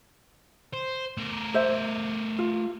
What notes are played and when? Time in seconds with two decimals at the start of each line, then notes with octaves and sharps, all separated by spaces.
0.73 C5
1.17 A3 A#4
1.54 C5 E5
2.39 F4